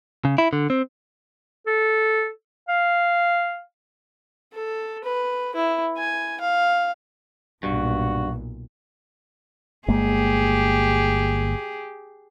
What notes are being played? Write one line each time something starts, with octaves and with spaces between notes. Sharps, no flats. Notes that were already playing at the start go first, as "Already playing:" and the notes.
C#3
E4
D3
C4
A4
F5
A4
B4
E4
G#5
F5
B1 G2 A#2 F#4
G1 G#3 A#3 G4 G#4